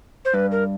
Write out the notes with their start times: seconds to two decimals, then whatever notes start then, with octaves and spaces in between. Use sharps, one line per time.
0.25 C5
0.34 G2 B4
0.52 A#4